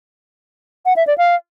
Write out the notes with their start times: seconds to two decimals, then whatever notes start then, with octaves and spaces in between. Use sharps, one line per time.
0.85 F#5
0.96 E5
1.07 D5
1.18 F5